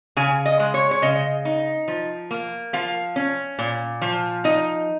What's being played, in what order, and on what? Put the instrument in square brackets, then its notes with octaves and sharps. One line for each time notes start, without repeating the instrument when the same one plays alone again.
[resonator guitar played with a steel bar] C#3 G#5
D#5
G#3
C#5
C#5
C#3 D#5
D#4
F3
A#3
F3 F5
C#4
A#2
F3
D#4 D#5